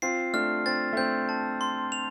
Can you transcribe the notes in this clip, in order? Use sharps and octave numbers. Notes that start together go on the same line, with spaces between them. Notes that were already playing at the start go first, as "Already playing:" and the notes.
C4 F4 C7
A3 D4 F6
C4 A6
A3
C4 G6
A5
C6
F7